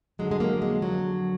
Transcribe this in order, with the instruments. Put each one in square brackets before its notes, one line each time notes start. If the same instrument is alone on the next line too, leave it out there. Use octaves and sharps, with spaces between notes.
[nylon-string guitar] F2 D3 F#3 G#3
G#3
A#3
G#3
F#3